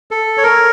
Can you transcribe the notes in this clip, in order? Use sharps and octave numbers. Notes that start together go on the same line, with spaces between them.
A4
C#5
A#4